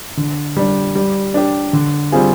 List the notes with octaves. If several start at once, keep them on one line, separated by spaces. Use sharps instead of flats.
D3
G3 D4
G3
D4 G4
D3
G3 C4 F4 G#4